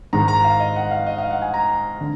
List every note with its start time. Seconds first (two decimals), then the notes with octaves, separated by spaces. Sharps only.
0.13 G#2 D#3 G#3 A#5
0.28 A#5
0.44 F5
0.60 D#5
0.76 F#5
0.91 F5
1.06 D#5
1.18 F5
1.31 F#5
1.42 G#5
1.54 A#5
2.01 D3